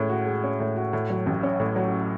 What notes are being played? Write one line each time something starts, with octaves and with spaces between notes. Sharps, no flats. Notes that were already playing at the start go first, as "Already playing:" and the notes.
Already playing: A2 G#3 C#4
F#4
G#3
C#4
A2
F#4
A2
F#3
A1
C#4
A2
F#3